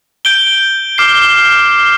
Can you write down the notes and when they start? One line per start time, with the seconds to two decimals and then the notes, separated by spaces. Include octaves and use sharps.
0.25 G6 D7 G7
0.98 D6 F6 C7